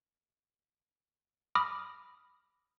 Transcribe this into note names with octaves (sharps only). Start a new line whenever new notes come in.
B5 D6 D#6 F6 A#6